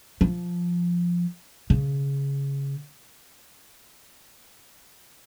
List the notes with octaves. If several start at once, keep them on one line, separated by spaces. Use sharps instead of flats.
F3
C#3